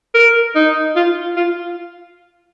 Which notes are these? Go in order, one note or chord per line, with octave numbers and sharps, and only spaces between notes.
A#4
D#4
F4
F4